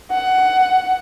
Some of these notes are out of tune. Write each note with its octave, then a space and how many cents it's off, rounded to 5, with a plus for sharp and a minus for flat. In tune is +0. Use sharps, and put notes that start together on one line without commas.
F#5 +15